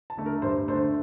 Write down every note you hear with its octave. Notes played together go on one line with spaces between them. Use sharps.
A5
D3 A3
A#4
G2 C5
D3 A3 C5